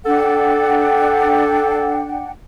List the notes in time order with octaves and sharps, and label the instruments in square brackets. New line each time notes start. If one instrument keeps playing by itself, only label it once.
[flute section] D4 F#5 G5 [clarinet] A4